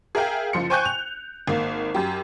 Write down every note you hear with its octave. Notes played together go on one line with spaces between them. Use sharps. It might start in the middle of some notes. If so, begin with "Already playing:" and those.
G#4 A#4 E5 F5 G5
F#1 F3 C6 C#7
C5 G5 G#5 C#6 F#6 G6
F7
G#1 A#3
F#2 G4